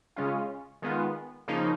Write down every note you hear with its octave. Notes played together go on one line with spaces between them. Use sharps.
C#3 G#3 C#4 F4
D#3 G#3 B3 F4
C#3 F3 A#3 D#4